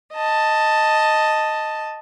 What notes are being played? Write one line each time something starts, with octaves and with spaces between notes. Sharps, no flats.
D#5 A5